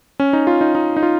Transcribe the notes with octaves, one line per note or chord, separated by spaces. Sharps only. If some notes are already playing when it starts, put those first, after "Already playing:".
C#4
D#4
F4
D#4
D#4
D#4
F4